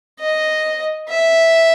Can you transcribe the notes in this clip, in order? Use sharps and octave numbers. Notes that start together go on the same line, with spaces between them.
D#5
E5